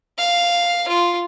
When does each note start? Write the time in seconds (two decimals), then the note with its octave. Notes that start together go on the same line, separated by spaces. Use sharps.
0.18 F5
0.88 F4